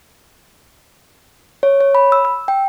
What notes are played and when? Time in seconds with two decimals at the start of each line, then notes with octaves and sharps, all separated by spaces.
1.63 C#5
1.80 C#5
1.95 B5
2.12 E6
2.25 E6
2.48 G5